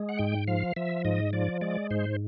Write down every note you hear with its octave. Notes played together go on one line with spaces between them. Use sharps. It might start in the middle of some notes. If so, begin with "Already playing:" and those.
Already playing: G#3
F#5
G#2 G5
F3 F5
F3 E5
G#2 D#5
F3 D5
G#3 D5
G#2 C5